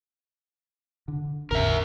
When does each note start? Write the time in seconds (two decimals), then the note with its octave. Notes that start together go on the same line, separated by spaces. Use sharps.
1.08 D3
1.51 A1 E2 D3 A#4 E5